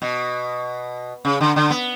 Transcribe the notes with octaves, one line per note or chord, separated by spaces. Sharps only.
B2
C#3
D3
D3
B3